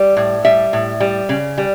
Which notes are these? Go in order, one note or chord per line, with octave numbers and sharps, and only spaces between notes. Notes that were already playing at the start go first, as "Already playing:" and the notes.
Already playing: G3
A2
G3 E5
A2
G3
C#3
G3